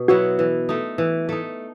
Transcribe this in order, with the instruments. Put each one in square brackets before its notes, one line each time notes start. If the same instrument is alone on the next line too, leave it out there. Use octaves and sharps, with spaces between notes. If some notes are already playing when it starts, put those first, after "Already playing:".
Already playing: [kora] B2
[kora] F#3 B3 E4 [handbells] F#4
[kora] E3
A3 D#4
E3
A3 D#4